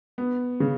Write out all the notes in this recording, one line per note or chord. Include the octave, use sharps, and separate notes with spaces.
B3
C#3